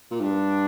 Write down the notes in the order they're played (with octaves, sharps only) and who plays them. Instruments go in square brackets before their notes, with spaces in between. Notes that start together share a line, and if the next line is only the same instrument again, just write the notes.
[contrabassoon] A#2
[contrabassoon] G2 [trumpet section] D4